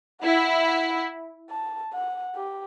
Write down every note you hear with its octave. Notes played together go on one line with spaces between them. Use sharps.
E4 F#5
F#5
A5
F#5
G4